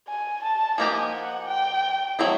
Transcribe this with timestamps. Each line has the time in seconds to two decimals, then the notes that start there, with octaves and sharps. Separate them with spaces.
0.08 G#5
0.44 A5
0.78 F3 A#3 D#4 G4 G#5
1.14 F#5
1.48 G5
2.19 F#3 A3 C4 E4 G#4